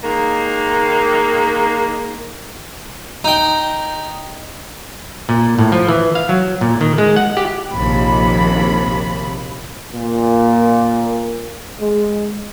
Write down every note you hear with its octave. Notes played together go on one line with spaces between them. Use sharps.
D#3 G#3 A#3
D#4 G5
A#2
A2
F3
E3
F5
F#3
A#2
D#3
G#3
F#5
G4
A#1 D#2 C3 B5
A#2
G#3